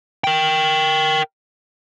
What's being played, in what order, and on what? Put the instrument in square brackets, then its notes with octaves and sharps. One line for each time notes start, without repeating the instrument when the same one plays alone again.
[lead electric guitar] A#4 G5